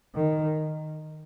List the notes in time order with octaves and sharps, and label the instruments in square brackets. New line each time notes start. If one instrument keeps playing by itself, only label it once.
[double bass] D#3